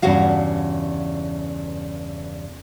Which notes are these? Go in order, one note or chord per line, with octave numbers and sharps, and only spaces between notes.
E2 G2 C#3 F#4 F5